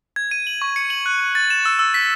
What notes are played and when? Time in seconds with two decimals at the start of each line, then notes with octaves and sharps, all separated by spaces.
0.16 G#6
0.31 D#7
0.47 F#7
0.62 C#6
0.76 C#7
0.90 F#7
1.06 F#6
1.20 F#6
1.35 A6
1.50 E7
1.65 E6
1.79 E6
1.94 B6